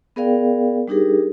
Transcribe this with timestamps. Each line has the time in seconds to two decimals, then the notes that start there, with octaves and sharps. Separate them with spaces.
0.16 B3 G#4 A#4 D5 F5 G5
0.88 G3 D4 D#4 G4 G#4 A#4